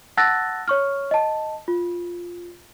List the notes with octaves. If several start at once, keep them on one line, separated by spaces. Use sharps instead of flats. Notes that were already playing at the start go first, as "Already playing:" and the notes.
F#5 A5 E6 F#6 A6 A#6
C#5 C#6 F6
D#5 A5
F4